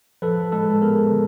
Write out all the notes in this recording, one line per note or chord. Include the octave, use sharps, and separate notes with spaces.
F3 A4 B4
G#3 A4 B4
B3 G#4 A#4
D3